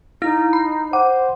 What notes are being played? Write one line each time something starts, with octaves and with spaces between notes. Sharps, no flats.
D#4 E4 A#6
B5
C5 F#5 D6